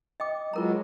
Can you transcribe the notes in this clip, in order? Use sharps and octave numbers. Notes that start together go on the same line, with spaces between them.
D#5 G5 D6
F#3 G#3 F4 A#4 A#5